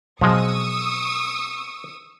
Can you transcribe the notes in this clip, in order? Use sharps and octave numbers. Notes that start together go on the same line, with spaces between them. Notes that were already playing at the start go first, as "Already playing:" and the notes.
B2 F3 F#3 G#3 C#6 D#6 E6